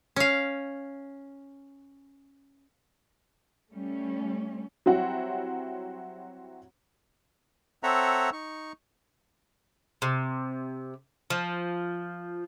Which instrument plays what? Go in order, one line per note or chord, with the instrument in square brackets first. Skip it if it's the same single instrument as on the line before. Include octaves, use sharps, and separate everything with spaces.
[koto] C#4 F5
[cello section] G3 A3 C#4
[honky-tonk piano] F#3 G3 C4 E4 F#4
[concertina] C4 A4 C#5 E5 F#5 A#5
D#4 C#6
[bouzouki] C3
F3